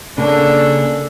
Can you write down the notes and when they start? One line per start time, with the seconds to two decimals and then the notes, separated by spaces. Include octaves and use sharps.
0.18 C#3 A#3 C#4 D4 A4